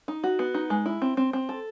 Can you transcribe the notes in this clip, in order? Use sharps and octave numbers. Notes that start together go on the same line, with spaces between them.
D#4
F#4
B3
D#4
G#3
E4
C4
C4
C4
A4